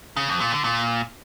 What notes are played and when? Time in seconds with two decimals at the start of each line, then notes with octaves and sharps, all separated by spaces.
0.17 C#3
0.28 F2
0.40 A#2
0.52 D3
0.64 A#2